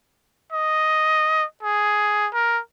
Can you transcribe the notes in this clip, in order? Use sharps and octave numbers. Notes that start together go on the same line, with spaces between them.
D#5
G#4
A#4